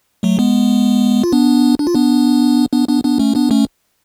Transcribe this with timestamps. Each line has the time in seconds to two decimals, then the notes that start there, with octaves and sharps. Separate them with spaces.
0.23 F#3 A3
0.39 G#3 B3
1.24 F4
1.32 B3 D4
1.79 D4
1.87 F4
1.95 B3 D4
2.73 B3 D4
2.89 B3 D4
3.04 B3 D4
3.19 A3 C#4
3.35 B3 D4
3.51 A3 C#4